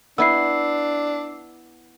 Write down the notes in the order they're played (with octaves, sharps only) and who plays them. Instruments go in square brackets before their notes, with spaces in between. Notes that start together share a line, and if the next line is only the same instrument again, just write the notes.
[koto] B3 E4 [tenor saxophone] D4 [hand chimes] E6 C7